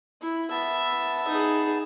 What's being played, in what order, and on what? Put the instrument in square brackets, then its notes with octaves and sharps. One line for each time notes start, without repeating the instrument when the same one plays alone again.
[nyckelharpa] E4
[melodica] B3 A5 [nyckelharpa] E5
[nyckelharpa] D#4 G#4